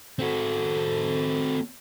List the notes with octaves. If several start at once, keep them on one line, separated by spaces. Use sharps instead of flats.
C4 F#4 A4